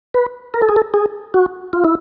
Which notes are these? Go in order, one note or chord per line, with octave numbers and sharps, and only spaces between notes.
B4
A#4
A4
G#4
A4
G#4
F#4
F4
E4